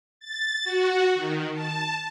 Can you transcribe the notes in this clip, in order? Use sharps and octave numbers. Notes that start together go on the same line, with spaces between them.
A6
F#4
D#3
A5